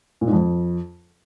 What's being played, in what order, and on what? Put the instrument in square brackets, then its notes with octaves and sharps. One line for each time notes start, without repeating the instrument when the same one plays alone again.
[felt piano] A#2
G#2
F2